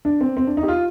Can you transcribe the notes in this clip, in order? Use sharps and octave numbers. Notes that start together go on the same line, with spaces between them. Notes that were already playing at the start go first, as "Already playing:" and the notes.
D4
C4
C4
D4
D#4
G4
F4